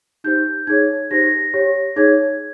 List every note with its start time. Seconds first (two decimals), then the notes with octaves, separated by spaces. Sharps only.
0.24 D#4 G4 C5 G6
0.67 D#4 G#4 C#5 G#6
1.11 D#4 G4 C5 A#6
1.54 G4 C#5
1.96 D#4 G#4 C#5 G#6